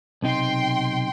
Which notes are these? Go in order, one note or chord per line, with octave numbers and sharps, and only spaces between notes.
B1 C3 D#4 G5 C6